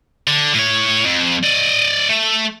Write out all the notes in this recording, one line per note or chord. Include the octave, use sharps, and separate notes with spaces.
D3
A2 C#5
F2
D5 D#5
A3